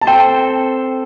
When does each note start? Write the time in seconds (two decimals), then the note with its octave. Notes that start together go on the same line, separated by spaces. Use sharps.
0.01 A5
0.07 C4 A4 C5 G5